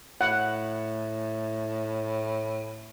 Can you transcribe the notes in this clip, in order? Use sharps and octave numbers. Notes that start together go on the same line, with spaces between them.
A2 F#5